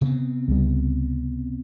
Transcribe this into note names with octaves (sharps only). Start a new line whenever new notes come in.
C3 B3 C4
C#2 G3